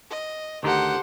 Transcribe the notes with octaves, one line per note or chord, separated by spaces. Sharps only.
D#5
D2 D#3 D#4 G4 A4 C5 F#5